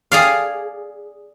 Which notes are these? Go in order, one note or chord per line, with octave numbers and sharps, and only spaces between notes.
G#4 D5 F5